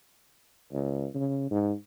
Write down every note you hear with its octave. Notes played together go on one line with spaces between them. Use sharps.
C#2
C#3
G#2